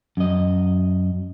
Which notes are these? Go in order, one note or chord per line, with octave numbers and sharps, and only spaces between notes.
F#2 D#5